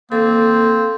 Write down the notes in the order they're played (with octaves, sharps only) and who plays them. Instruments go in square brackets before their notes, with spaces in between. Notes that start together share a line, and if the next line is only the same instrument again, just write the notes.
[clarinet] A#3 [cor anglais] C4 [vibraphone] A4